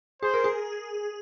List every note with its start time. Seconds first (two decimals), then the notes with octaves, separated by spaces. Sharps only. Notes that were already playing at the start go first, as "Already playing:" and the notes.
0.22 G#4 C5
0.34 A#4
0.44 G#4